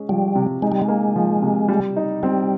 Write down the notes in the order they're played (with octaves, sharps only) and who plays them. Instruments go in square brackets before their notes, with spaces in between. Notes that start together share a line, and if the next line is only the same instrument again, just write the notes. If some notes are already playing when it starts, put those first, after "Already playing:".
Already playing: [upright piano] G#3 C#4
[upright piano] F3 [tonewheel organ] G3
[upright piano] C3
[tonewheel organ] G#3 [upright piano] D#4
[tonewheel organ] G3
G#3
[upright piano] A#3
F3
C3
G3
D#4
[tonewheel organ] G3 [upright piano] C4